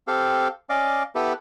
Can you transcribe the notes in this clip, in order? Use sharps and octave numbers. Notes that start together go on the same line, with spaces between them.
C4 G4 A4 F5
C#4 D5 D#5 F5 D6
B3 E4 G4 A4 B4